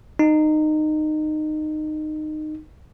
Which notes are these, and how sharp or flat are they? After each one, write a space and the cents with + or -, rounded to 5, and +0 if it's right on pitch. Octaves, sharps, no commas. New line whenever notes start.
D#4 -20